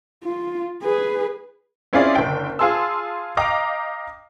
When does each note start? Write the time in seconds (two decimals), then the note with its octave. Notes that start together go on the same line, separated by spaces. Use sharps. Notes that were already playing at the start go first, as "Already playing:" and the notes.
0.24 F4
0.83 G#4 B4
1.93 C4 C#4 E4 F4 G#4 D5
2.15 F#1 D3 G5
2.59 F4 G#4 A5 C6 E6
3.37 D#5 F5 G5 A#5 D6